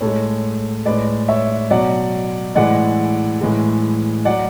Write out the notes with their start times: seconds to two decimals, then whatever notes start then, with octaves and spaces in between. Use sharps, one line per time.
0.01 A2 G#3 A4 C#5
0.86 A2 G#3 B4 D5
1.28 C#5 E5
1.70 B2 F#3 D5 F#5
2.55 A2 E3 G#3 D5 F#5
3.41 A2 E3 G#3
4.25 F#3 D5 F#5